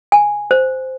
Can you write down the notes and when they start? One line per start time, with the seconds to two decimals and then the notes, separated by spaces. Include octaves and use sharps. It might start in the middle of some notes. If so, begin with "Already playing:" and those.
0.12 G#5
0.51 C5